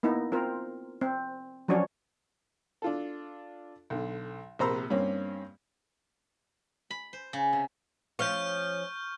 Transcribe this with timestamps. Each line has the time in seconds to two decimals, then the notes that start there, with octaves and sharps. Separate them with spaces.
0.03 A#3 B3 D#4 E4
0.32 C4 F4 A#4 C5
1.01 C4
1.68 F3 F#3 C#4 D4 F#4 C#5
2.82 D4 F4 A4
3.90 B1 D3
4.59 A#1 C3 C5 A#5 B5 E6
4.90 G2 A#3 C4 C#4
6.91 B5
7.13 C5
7.33 C#3
7.53 C3
8.19 F3 C#4 F4 C#6 F6 G6